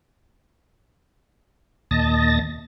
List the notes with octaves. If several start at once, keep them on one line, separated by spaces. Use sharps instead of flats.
D#2 A#2 D#5 A5 A6 A#6